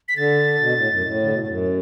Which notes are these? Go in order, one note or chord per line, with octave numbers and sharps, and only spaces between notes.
B6
D3 A6
B2
A2
F#2
A2
D3
B2
A2
F#2